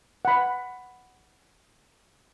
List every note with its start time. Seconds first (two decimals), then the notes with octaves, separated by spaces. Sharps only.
0.25 F#5 B5